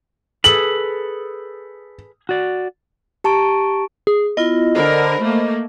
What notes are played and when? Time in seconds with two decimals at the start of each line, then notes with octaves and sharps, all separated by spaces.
0.44 G#4 A4 B4 F#7
2.29 F#4 D5
3.24 G4 A5 A#5 C#6 D7
4.07 G#4
4.37 B3 E4 F4 D#5
4.75 D3 A#4 C5 B5
5.21 A3 A#3